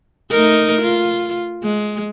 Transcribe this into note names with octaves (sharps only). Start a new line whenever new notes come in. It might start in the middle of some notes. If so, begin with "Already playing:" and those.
A3 D#4 A#4
F4
G#3